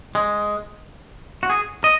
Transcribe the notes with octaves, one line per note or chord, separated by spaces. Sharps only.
G#3
F#4
G#4
D#5